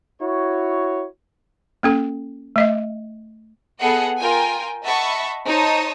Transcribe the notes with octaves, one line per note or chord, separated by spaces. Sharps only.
E4 F#4 C#5
A#3 C#4 A4
A3 D#5 E5
B3 G#4 A4 D#5 F#5
F4 A#4 G5 G#5
D#5 E5 F#5 A5 B5 C#6
D#4 C5 C#5 A5 D#6